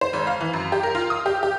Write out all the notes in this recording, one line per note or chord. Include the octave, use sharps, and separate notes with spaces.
C5
G#1
F5
E3
F#2
G4
A#4
F4
D#6
G4
G4